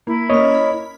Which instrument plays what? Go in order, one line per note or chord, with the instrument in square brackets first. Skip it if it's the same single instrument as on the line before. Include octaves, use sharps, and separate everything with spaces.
[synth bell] A#3 [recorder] E4
[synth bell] A#3 C#4 F6 [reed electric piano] C#5 D#5
[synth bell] B5